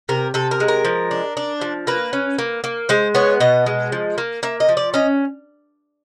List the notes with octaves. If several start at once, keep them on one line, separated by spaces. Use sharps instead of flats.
C3 A#4
C3 A4
A#4
G#3
A#4
F3
D4
D4
F3
A#3 B4
C#4
A#3
A#3
G#3 C5
B3 C#5
B2 D#5
G#3
F3
A#3
A#3 E5
D#5
F3
D5
C#4 D#5